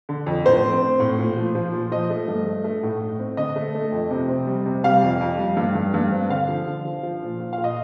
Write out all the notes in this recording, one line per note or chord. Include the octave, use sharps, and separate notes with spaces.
D3
F2
A2 C5
C4
C4
A2
A#2
F3
F3
A#2
F3 D#5
A3
G2
A3
A3
A2
A2
C4
D3 D#5
A3
A3
F2
C3
C4
G3
C3
G3 F5
F2
F2
G3
G2
G2
G2
C4
D3 F5
F3
D3
F3
F3
A#2
A#2
F5
A#2
D#5